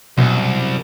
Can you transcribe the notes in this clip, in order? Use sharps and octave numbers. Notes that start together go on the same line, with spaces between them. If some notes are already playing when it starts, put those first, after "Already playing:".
C2 F#2 B2